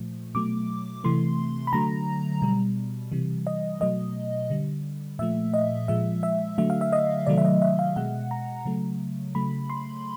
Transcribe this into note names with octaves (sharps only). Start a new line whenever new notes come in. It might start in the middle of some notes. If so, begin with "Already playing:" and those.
Already playing: A#2 F3 A3
B2 F#3 A3 D6
C3 E3 A3 C6
B5
D3 F#3 A3 A#5
B2 G3
C3 E3 G3
D#5
B2 F#3 A3 D#5
D3 G3
A#2 F3 A3 E5
D#5
A#2 F3 G#3 E5
E5
D3 F#3 A3 E5
F5
E5
D#5
C3 D#3 F#3 A3 D5
E5
D#5
E5
F5
B2 G#3 F#5
A#5
C#3 F#3 A3
C#3 F#3 A3 B5
C6